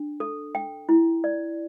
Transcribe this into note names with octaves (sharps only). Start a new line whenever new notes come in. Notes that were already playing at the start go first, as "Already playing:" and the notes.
Already playing: D4
A4
G5
E4
D5